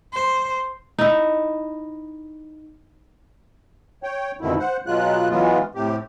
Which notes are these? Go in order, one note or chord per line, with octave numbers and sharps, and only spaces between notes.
C5
D#4 E4
C#5 G5
F2 G#2 B2 D3 D#3 E4
C5 F#5
B2 F#3 G#3 F4 F#6
E3 F#3 G#3 B3 F4
A2 C3 G4